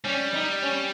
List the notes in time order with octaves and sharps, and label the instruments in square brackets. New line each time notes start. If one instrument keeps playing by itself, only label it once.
[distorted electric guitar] G3 [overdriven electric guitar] C#4
[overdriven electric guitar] D#4
C#4